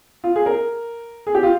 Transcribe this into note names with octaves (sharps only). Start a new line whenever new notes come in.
F4
G#4
A#4
G#4
G4
F4